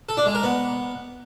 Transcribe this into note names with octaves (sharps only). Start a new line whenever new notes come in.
A4
D4
G#3
A#4
B3